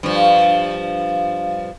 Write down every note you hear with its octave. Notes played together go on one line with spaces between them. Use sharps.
G2 F3